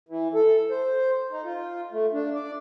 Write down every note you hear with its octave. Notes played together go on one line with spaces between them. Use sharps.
E3
A4
C5
D#4
F4
A3
D4
D5